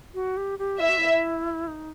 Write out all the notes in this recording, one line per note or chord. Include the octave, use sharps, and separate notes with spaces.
F#4
G4
G4
E4 E5
F#4
E4
D#4